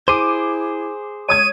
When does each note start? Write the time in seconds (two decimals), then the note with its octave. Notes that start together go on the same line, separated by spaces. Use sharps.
0.08 E4 G#4 C5 D6 D#7
1.29 G#3 C#5 D#6 G#6 D#7